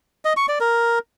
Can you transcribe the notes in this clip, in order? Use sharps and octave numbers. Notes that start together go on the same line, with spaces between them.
D#5
C#6
D5
A#4